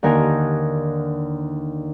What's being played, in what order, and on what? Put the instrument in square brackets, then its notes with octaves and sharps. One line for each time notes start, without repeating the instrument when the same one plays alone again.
[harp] D#2 D3 D#4 A#4 G#5